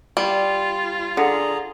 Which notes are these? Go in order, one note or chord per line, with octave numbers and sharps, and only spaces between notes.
G3 F4
D3 G#4 A#5